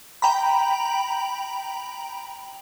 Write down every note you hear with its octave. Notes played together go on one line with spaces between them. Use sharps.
G5 A#5 B5